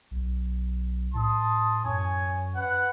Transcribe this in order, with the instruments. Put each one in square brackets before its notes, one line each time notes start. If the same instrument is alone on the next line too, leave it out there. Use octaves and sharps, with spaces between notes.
[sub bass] B1
[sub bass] A2 [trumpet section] A5 C6 D#6
[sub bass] F#2 [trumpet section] C#5 G#5
[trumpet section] B4 F#5